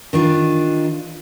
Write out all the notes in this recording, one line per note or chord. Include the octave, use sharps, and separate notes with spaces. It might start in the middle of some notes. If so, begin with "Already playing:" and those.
D#3 D4 F4